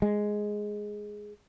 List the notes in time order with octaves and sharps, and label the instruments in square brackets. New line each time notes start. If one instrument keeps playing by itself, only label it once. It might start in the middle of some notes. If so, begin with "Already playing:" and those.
[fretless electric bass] G#3